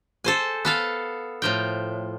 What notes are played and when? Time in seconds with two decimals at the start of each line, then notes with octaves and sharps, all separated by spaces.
0.24 A4 C5 G#5
0.65 B3 A4 F5
1.42 A2 F3 G5